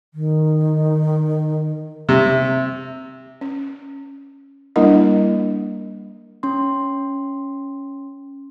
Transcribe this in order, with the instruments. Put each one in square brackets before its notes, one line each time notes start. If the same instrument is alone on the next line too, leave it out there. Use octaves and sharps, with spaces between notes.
[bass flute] D#3
[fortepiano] C3 [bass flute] E5
[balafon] C#4
G3 A#3 D4 E4 A#4 D#5
[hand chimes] C#4 C6